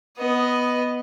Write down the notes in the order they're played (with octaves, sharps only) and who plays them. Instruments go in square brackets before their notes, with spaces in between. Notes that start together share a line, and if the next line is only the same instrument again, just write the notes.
[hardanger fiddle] B3 D#5